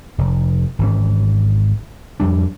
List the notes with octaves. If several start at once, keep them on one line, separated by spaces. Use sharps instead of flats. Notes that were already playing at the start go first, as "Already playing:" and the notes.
F1
G#1 E3 C#4
F2 G3 D4